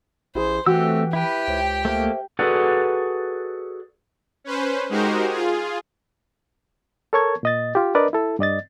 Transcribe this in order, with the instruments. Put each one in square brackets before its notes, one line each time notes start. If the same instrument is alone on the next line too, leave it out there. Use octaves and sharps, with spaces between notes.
[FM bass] A1 [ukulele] E4 G#4 [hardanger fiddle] C5
[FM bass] E3 [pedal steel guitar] A3 C4 E6 [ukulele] F#4 [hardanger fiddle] G4
[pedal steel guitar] E4 B4 [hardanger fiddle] G4 G5
[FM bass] C#2 [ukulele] C5 C#5
[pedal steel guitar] A3 A#3 [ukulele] C5 E5 A5
[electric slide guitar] F#4 G#4 A4 B4 D5 F#5
[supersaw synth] C#4 B4 C5
G#3 D#4 F#4 G4 A#4 C5
F4 G#4
[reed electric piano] A4 A#4 C#5 A5 C#6 G#6
A#2 D#5 A6
F4 G4
D4 A#4 B4 D5 D#5
E4 A4
G2 D5 D#5 A6